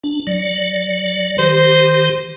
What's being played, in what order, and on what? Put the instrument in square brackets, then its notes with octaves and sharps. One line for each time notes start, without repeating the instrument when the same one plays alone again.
[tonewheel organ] D4
F#3 D5
[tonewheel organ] D#3 G4 [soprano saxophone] C5